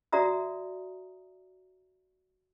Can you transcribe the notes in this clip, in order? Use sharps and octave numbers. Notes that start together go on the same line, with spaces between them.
F#4 D5 E5 A#5 D#6